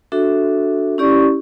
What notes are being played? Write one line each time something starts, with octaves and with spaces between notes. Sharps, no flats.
D4 F#4 A4 E5
C#4 E4 G4 D5 C#6